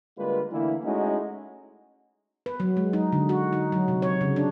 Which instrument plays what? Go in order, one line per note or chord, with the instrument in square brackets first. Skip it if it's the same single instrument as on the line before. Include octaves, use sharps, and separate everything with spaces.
[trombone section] D3 G3 G#3 A#3 F4 B4
D3 E3 A3 A#3 E4
G#3 A3 C#4 D#4 E4 F#4
[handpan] B4
F#3
G#3
D#4
D3
F#4
D#4
F#3
C3
C#5
C#3
D4